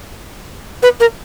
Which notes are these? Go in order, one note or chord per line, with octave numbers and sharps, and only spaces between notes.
B4
A#4